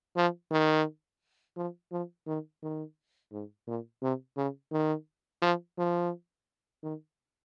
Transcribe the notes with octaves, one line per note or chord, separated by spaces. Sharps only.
F3
D#3
F3
F3
D#3
D#3
G#2
A#2
C3
C#3
D#3
F3
F3
D#3